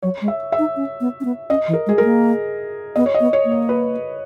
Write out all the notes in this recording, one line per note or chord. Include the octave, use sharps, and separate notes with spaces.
F#3 C#5
G#3
E5
E5
D#4
C#4
B3
C#4
B3
C#4 D#5
E3
A#4
G#3 G#4
G#3 A#4
A#3
B3 D#5
C#5
D#5
B3
C#5
A#3
C#5
B4